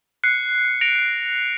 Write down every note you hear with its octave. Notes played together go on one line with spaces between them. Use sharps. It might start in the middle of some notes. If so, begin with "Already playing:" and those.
F#6 C7 C#7
A#6 D7 F7